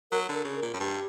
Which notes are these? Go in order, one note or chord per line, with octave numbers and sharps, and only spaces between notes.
F#3 A#4
D3 A#4
C#3
A#4
A#2
F#2
G2 G4